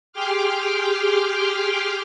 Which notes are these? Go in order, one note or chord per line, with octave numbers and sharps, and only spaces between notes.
G4 G#4 G5 C6 D6 F6